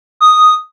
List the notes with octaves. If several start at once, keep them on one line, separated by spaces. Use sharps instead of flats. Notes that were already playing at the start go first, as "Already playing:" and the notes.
D#6